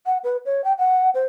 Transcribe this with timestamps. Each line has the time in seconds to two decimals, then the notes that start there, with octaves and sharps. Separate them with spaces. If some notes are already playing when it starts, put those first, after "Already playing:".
0.06 F#5
0.24 B4
0.46 C#5
0.64 G5
0.79 F#5
1.14 C5